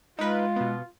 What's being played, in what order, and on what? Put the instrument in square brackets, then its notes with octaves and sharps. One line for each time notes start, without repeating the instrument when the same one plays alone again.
[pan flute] G#3 [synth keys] D#4 B4 [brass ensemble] F4
[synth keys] B2 B3